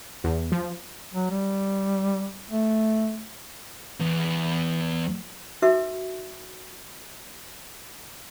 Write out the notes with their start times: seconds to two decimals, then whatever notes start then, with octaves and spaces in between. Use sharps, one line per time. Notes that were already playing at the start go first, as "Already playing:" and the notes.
0.24 E2
0.52 F3
1.14 F#3
1.31 G3
2.51 A3
4.00 E2
5.62 D#4 F#4 A4 B4 E5